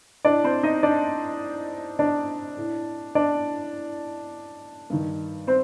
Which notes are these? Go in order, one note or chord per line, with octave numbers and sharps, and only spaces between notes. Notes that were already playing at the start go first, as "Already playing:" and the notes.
A2 D4 D5
C4 C5
D#4 D#5
D4 D5
D4 D5
A2
D4 D5
G2 D#3
C4 C5